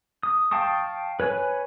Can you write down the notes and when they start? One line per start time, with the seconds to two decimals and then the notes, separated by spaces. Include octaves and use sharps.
0.23 D#6
0.51 F5 G5 A5 C#6 D#6
1.20 B4 C#5 G#5